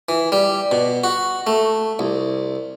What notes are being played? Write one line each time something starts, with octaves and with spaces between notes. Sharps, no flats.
E3
G3
B2
F#4
A3
C2